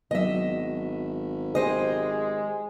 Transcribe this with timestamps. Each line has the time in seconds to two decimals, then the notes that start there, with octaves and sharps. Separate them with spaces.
0.11 G#1 F#3 B3 D4 D#5 E5
1.55 G#3 G4 C5 D#5